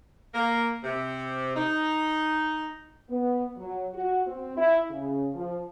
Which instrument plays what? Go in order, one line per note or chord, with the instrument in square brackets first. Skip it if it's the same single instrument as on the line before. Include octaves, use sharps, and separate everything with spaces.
[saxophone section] A#3
C3
D#4
[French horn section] B3
F#3
F#4
C4
E4
C#3
F3